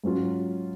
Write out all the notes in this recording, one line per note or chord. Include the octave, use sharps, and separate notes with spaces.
G#2 F#3 C#4 F4